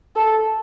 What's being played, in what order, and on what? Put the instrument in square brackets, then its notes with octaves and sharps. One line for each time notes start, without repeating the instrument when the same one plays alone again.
[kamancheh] A4